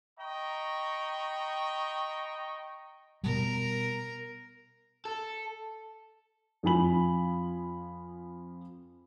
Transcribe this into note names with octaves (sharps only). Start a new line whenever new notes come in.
D#5 G5 A#5 B5 C#6
B2 G3 A#4
A4
F2 F3 F4 G#5 B5 F#7